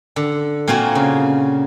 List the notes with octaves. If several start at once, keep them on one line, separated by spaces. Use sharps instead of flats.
D3
A#2 A#3 C4 F4 F#4 G#5
C#3